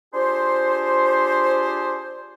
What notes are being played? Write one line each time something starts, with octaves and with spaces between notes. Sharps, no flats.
D4 F4 G4 G#4 C5